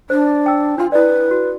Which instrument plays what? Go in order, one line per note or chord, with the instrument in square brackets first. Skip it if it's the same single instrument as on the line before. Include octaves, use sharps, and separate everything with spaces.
[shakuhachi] D4 [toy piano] C5
[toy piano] G5 E6
[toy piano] D4 C6 [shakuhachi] F4
[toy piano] E4 D5 [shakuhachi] B4
[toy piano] F#4